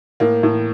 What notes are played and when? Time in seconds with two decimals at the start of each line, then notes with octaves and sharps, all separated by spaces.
0.20 A2 A#3
0.43 A2